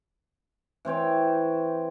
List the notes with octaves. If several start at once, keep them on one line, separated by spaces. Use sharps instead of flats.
E3 C4 C#5 G5